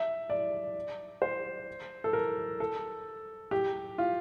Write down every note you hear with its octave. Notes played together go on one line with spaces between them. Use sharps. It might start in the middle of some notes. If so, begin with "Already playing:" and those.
Already playing: E5
D5
C5
A4
A#4
A4
G4
F4